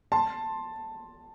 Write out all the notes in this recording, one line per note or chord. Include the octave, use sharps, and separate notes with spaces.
A5 C6